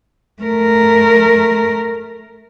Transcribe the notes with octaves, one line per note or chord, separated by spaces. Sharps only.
A3 A#4